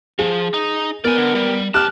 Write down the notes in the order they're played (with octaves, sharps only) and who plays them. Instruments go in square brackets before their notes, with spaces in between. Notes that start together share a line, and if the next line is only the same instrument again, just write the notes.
[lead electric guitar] F3 [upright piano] G#4
[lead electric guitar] D#4
[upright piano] B3 [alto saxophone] A#4 [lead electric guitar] D5 G#5
[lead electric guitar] D3
G3
[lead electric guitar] C#2 A5 [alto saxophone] G4 [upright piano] F6 F#6